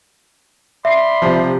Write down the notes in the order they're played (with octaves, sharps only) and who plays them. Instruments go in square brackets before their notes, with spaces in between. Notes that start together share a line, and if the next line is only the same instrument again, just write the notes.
[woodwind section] D5 B5 C6 [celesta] E5
[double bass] C3 [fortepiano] F3